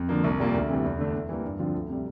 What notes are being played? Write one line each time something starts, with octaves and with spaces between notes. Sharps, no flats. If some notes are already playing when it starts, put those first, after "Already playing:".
Already playing: F2
D3 F3 A#3
C2
A#2 G3 A#3 F4
D2
C3 E3 G3
E2
D3 A3 D4
E2
E3 G3 A#3
G2
D3 F3 C4 F4
D2
C3 G3